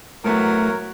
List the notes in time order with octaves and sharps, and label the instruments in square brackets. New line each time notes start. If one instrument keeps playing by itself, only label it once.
[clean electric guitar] A2 A3 B3 [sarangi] F#3 [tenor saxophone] A#4